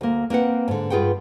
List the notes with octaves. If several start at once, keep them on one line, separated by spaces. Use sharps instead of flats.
D2 A#3
A#3 C4 B4 F#5
G#2 D3
G2 F4 G#4 B4 F#5 G5